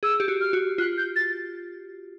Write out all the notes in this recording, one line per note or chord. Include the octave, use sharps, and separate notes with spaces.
G#4 E6
G4
F#4
F6
F#4
F4 F#6
G6
A6